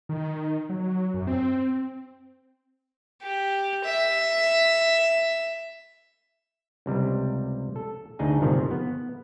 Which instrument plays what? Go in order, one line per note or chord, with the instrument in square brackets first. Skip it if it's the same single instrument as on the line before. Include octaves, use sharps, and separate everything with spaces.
[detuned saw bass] D#3
F#3
F#2
C4
[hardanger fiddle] G4
E5
[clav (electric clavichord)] C#2 C3 G3
A4
D2 D4 D#4 G#4
G1 C3 D#3 F3
B3